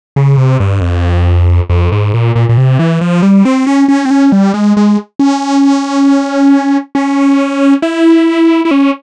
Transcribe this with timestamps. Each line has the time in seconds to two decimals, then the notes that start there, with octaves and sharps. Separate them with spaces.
0.16 C#3
0.37 C3
0.60 G2
0.81 F2
1.70 F2
1.92 G#2
2.14 A#2
2.36 A#2
2.49 A#2
2.57 C3
2.79 E3
3.01 F3
3.22 G3
3.45 C4
3.67 C#4
3.88 C#4
4.05 C4
4.11 C#4
4.32 G3
4.54 G#3
4.77 G#3
5.19 C#4
6.95 C#4
7.82 E4
8.65 E4
8.71 C#4